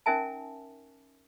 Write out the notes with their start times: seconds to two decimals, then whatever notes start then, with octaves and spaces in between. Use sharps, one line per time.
0.06 C#4 D#4 A#4 E5 G#5 A5